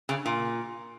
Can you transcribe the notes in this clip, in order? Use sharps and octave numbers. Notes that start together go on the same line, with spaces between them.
C#3
A#2